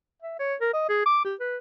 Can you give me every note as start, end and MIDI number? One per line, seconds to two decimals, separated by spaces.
0.22 0.36 76
0.39 0.55 73
0.61 0.73 70
0.73 0.84 75
0.89 1.04 68
1.06 1.19 86
1.25 1.35 67
1.40 1.57 71